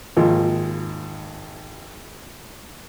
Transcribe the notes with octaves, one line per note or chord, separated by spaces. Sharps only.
G#1 D#2 F3 F4